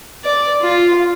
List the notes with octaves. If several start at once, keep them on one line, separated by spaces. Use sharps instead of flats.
D5
F4